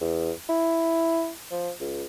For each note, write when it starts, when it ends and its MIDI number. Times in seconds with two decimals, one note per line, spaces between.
0.01 0.32 40
0.49 1.29 64
1.51 1.70 53
1.80 2.05 37